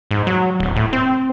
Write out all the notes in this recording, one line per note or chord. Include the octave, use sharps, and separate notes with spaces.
G#2
F#3
D1
A2
C4